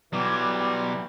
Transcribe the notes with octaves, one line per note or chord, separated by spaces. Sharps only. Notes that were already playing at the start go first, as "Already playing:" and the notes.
B2 E3 F#3 G3 D6